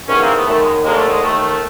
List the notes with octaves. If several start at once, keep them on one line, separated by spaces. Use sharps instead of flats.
E2 C3 D#3 B3 C#4
A#3 C4
A3 B3
F#2 D#3 A3
G#3
D#2 D3 G#3 A#3
A3
G#3
D#2 D#3 A3